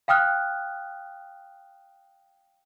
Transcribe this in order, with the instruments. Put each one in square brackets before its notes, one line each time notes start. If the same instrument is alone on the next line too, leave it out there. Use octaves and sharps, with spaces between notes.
[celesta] F5 G5 D#6 F6 F#6